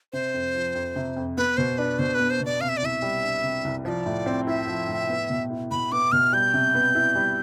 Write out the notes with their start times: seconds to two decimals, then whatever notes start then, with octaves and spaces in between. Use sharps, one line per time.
0.13 C3 C5
0.34 F2
0.55 F3
0.75 F2
0.96 C3
1.16 F2
1.37 B3 B4
1.57 B2 C5
1.78 D4 B4
1.99 B2 C5
2.14 B4
2.20 B3
2.30 C5
2.41 B2 D5
2.61 C3 F5
2.69 E5
2.77 D5
2.82 C2 E5
3.02 G3
3.23 D4
3.44 C3
3.64 C2
3.85 F3 E5
3.89 D5
4.06 A2
4.26 C4
4.47 E4 E5
4.67 F3
4.88 A2
5.09 B3
5.30 B2
5.50 E4
5.71 B2 B5
5.92 B3 D6
6.12 B2 F6
6.33 G3 G6
6.54 C3
6.74 B3
6.95 E4
7.15 G3